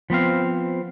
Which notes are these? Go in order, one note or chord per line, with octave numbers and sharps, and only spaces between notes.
F3 B3 C4 F5